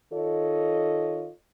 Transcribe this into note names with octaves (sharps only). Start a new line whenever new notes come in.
D#3 F4 A4 C#5 D#5